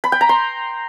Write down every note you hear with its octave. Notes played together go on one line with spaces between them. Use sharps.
B5
G5
A#5
C6